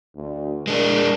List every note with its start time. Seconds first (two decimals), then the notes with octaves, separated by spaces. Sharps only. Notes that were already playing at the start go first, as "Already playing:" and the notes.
0.16 D2
0.67 G#3 D4 A#4